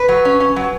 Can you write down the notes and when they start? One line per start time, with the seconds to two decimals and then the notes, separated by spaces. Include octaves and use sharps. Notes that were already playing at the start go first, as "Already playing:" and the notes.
Already playing: B4
0.08 F#3
0.25 C#4
0.40 C#4
0.56 F#3